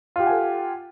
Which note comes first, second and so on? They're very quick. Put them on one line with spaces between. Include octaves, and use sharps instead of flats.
F4 G4 F#5 G#5 A4